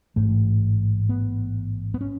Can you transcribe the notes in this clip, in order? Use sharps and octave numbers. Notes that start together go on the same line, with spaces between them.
A1 G#2 A3
B3
B3
C#4